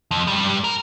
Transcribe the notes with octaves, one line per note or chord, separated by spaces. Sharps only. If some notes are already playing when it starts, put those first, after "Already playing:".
F2
G2 G3
A#4